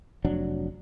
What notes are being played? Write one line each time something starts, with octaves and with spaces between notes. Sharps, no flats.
F1 F#3 D4